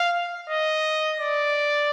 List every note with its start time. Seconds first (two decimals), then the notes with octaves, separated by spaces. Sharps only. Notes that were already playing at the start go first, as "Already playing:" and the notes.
Already playing: F5
0.49 D#5
1.20 D5